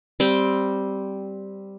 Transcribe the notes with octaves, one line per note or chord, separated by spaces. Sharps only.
G3 C4 G5